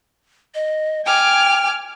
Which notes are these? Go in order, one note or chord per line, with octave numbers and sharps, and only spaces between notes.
D#5
G5 G#5 D6 F6